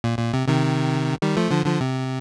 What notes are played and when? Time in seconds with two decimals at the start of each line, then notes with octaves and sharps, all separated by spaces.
0.04 A#2
0.19 A#2
0.34 C3
0.48 C3 D#3
1.22 D#3 G3
1.37 F3 A3
1.51 D3 F3
1.66 D3 F3
1.81 C3